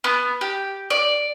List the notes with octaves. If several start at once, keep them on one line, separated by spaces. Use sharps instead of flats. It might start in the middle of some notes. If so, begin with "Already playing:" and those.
B3
G4
D5